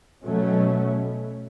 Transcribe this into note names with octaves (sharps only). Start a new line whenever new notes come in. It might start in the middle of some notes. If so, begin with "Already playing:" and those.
B2 F#3 A3 C#4